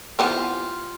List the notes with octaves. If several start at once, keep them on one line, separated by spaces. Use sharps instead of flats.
E3 B3 C4 F4 G4